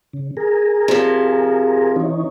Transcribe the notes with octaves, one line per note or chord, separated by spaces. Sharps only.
C#3
G#4 A#4
C3 F3
E3 C#4 D#4